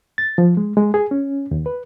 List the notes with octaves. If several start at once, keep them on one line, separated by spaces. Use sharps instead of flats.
A6
F3
G#3
G#3
G#4
C#4
D#2
B4